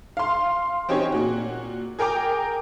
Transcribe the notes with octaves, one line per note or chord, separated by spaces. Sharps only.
F5 C6
C4 C#4 D#4 G4 G#4 C#5
A#2 F#4
G#4 A#4 G5 A#5 D6